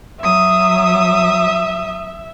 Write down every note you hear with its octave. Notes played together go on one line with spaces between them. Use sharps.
F#3 E5 D#6